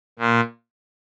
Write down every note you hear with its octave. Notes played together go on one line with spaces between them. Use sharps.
A#2